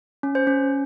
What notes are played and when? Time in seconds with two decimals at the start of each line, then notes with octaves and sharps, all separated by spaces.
0.23 C#4
0.35 C5
0.47 C#4